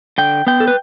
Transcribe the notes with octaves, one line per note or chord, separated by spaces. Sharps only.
D3 G5
B3 G5
A4
B4